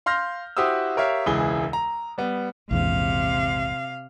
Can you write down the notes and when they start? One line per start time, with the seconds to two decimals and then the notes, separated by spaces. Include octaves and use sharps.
0.06 F5 C6 F6 G6 A#6
0.57 E4 F#4 G4 C5 D#6 E6
0.96 G4 A#4 C#5 E5 F5
1.26 E1 C#2 E3 E4 G#4 G7
1.73 A#5
2.18 G3 B3
2.71 A#1 E2 G#2 C3 F5